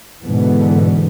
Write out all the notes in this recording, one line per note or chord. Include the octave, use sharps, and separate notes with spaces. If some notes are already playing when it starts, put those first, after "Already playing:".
G#2 B2 D3 E3 B3